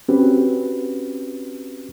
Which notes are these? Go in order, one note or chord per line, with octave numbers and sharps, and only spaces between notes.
C4 C#4 F#4 G4 B4